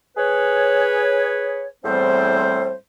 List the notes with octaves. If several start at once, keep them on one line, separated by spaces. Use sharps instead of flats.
G#4 B4 C#5
E2 A2 G3 C4 C5